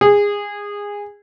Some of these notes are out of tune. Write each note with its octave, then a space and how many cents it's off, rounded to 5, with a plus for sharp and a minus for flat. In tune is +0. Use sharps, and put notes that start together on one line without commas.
G#4 -20